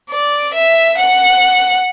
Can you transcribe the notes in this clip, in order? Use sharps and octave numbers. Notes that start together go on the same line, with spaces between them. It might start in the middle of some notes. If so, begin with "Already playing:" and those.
D5
E5
F#5